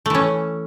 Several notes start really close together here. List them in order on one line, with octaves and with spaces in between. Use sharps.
A3 E3 C#4